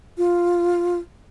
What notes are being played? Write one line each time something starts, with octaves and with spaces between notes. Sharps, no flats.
F4